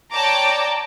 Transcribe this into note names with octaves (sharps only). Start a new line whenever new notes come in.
C#5 D5 G5 A5 A#5 D6